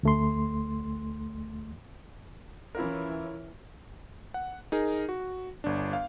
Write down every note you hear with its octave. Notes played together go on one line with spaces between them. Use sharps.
D2 A3 C6
E3 C#4 E4 F4 A#4
F#5
D#4 G#4 A#4
F#4
G1 D4
F5